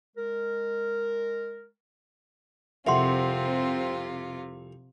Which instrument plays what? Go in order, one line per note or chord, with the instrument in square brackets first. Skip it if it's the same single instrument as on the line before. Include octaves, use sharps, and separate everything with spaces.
[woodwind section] G#3 A#4
[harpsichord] C2 F2 [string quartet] C3 F4 [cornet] C4 [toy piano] E5 F#5 C6